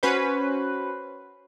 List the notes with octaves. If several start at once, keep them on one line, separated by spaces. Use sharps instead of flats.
C#4 F#4 B4 C5